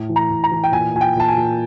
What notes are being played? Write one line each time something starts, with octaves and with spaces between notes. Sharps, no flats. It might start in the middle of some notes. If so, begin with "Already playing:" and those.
Already playing: A2
E3
A#5
A2
A#5
E3
G5
A#2 G#5
A#2 G#5
G5
A#2 A5
G#5
A#2